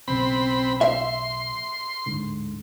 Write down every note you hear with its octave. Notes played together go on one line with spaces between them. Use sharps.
B1 C#3 C4 B5
E5 C6
D1 G#2 D3